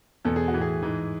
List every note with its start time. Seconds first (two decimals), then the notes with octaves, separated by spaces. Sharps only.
0.25 E2 B2 A4
0.36 G#4
0.48 F#4
0.54 A2 E3
0.61 G#4
0.83 G#2 E3